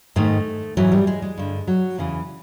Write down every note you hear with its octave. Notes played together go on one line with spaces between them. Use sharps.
G#2 D#3 A3
G#2 E3 F#3
G3
G#3
G#3
G2 D3
F#3
E2 C#3 E3